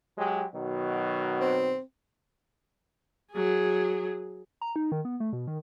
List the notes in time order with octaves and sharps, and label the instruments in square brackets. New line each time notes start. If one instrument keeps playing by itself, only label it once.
[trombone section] F#3 G#3 G4
B2 D#3 F#3
[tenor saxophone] C4
[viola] F#3 G#4
[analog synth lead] A#5
D#4
D#3
B3
A3
B2
D#3